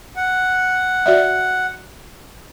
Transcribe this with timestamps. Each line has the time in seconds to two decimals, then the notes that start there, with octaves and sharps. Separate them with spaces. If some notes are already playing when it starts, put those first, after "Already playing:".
0.16 F#5
1.06 F#4 D5 E5